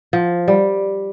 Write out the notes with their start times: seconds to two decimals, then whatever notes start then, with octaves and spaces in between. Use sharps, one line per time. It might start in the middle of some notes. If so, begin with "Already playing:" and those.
0.13 F3
0.48 G3